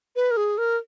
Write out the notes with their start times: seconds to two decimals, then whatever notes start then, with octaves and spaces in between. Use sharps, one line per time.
0.16 B4
0.31 A#4
0.37 G#4
0.58 A#4